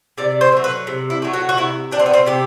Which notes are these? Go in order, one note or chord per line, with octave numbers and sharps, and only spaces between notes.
C3 D5
C5
F#3 A3
B4
C3
E4
F#3 A3
F#4
F#4
C3 E4
G3 D4
C4
B3
C4
C3 G4